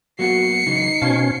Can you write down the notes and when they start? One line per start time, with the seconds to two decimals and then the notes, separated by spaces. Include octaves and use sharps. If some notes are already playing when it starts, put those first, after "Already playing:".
0.19 F#3 A#3 B3 F#4 C7 C#7
0.66 C#3 E3 F#3 D#4
1.02 B2 C#4 C5 F5 A5